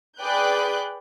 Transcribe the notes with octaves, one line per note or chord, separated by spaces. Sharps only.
G#4 B4 D5 G5 F#6 G6